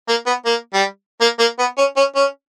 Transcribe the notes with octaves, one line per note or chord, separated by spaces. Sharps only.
A#3
B3
A#3
G3
A#3
A#3
B3
C#4
C#4
C#4